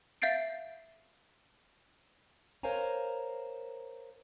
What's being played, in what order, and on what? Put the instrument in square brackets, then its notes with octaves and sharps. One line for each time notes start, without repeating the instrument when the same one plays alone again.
[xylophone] E5 F5 G6 A6 C7 D7
[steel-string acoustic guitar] A#4 C5 C#5 F5 G#5 A#5